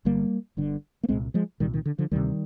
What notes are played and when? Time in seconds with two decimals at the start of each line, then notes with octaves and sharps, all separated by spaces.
0.05 G1 G2 D3 G3 A#3
0.57 G1 G2 D3
1.03 A#3
1.09 C2 A#2 G#3 C4
1.34 F3 G#3
1.60 C2 A#2 D#3 G3
1.74 D#3
1.86 D3
1.99 D3 F3
2.11 D2 C3 D#3 G3